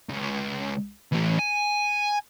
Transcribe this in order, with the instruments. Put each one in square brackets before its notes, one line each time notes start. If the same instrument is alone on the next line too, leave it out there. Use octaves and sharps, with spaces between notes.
[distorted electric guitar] C#2
E3 A3
G#5